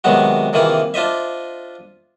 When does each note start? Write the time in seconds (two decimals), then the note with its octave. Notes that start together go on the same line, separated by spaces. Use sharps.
0.04 C3 D#3 F#3 G#3 B3 F#4
0.53 C3 D#3 E3 A#3 F4 G#4
0.94 D4 F4 C5 D#5 E5